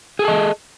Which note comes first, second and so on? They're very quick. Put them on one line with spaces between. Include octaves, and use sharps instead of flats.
G#4 A4 A5 D#5